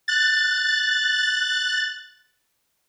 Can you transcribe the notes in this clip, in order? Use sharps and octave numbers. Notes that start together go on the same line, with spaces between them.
F#6 A6